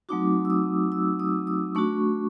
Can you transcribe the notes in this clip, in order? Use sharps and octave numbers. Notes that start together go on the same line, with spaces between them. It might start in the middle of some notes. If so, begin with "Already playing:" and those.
F#3 A3 C4 D#4 F#4 D6
E6
D#6
E6
D#6
D#6
A3 D4 F#4 C#6